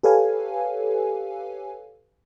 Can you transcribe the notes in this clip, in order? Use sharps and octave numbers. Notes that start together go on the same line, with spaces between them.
G4 A4 B4 C#5 F5 G#5